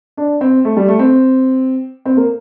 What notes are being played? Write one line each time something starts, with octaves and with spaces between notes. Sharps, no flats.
D4
C4
A3
G3
A3
C4
C4
A#3